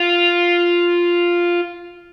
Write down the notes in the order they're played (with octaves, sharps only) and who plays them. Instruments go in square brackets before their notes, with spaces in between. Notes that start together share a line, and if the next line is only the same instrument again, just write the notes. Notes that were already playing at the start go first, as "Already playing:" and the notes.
Already playing: [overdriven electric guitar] F4